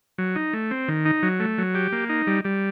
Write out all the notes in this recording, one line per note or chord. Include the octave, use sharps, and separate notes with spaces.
F#3
D#4
A3
C4
D#3
D#4
F#3
A3
F#3
G4
A#3
D#4
G3
G3